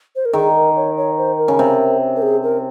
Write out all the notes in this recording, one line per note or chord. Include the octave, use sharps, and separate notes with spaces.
C5
A#4
D#3 G#4
A#4
C#5
C#5
C5
A#4
C#3
C3
A#4
G#4
A#4